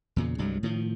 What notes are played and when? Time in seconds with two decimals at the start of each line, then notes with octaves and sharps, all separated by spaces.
0.16 E2 A#2 C#3
0.38 C2 G2 F#3 G#3
0.63 A2 D#3 F3